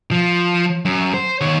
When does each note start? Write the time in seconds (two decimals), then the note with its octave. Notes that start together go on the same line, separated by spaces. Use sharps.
0.11 F3
0.85 F#2
1.14 C5
1.41 D#3 C#5